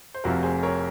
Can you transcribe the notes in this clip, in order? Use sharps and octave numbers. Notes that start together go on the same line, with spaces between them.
C5
F1 F2 C3 F3 F#4 A#4
G#4 C5
A#4 C#5